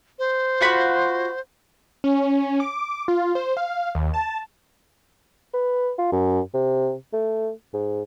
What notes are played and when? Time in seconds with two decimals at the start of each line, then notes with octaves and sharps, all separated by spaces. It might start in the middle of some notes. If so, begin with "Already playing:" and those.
0.19 C5
0.61 F4 F#4 B5
2.04 C#4
2.60 D6
3.08 F4
3.35 C5
3.57 F5
3.95 D#2
4.14 A5
5.54 B4
5.98 F4
6.12 F#2
6.54 C3
7.13 A3
7.74 G#2